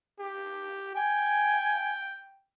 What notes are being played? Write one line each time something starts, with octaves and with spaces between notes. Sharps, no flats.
G4
G5 G#5